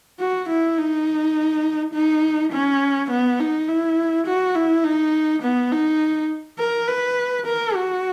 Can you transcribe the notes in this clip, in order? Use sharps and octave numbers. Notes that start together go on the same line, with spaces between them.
F#4
E4
D#4
D#4
C#4
B3
D#4
E4
F#4
E4
D#4
B3
D#4
A#4
B4
A#4
F#4